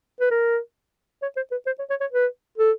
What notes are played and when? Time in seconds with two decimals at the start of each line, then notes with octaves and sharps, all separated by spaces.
0.20 B4
0.31 A#4
1.22 C#5
1.37 C5
1.52 B4
1.67 C5
1.79 C#5
1.90 C#5
2.01 C#5
2.12 B4
2.58 A4